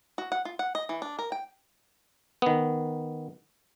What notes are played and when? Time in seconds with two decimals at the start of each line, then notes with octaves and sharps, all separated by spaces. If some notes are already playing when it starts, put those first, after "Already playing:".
0.18 F#4
0.32 F#5
0.45 F4
0.59 F#5
0.75 D#5
0.89 E3
1.02 D4
1.19 A#4
1.32 G5
2.42 D#3 B3